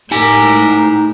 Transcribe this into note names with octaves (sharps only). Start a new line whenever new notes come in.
A2 D#4 G4 A#4 G#5